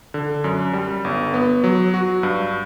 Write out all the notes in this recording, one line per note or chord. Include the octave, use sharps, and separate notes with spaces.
D3
F#2
G3
G1
B3
F#3
F#4
G2